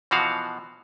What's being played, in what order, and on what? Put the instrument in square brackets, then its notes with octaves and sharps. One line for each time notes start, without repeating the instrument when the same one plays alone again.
[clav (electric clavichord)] B2 E3 F3 F#4 F5